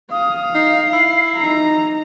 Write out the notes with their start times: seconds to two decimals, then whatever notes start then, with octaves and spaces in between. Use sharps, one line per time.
0.11 F5 D#6
0.55 D#4 C7
0.93 E4
1.37 D#4 A#5